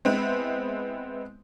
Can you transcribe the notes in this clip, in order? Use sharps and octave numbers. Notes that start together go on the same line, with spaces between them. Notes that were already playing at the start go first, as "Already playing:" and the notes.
G#3 B3 C4 E4